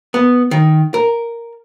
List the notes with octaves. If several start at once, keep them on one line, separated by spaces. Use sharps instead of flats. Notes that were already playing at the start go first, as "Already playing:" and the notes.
B3
D#3
A#4